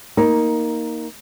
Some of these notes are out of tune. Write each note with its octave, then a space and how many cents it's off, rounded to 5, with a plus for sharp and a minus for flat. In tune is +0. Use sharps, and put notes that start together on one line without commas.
A#3 +0 D#4 +10